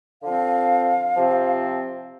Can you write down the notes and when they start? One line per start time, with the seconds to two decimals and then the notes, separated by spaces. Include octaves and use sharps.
0.23 D3 F3 C4 F5
1.16 C3 F3 C4